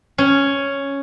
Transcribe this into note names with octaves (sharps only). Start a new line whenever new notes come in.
C#4